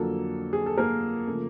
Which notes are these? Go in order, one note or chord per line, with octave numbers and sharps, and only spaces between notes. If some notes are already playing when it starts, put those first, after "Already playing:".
Already playing: F2 D3 F#3 A#3 A4
G#4
A4
A#3 A#4
C#3 F3 A3